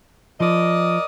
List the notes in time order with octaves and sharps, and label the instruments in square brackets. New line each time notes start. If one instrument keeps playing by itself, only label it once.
[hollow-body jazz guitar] F3 [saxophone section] A#4 D5 D#5